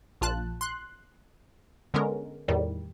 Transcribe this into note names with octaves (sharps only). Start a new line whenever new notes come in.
A#1 F4 A5 F#6
C6 F#6
D3 G#3 B3 C#4 A#4
E2 A2 D#3 G3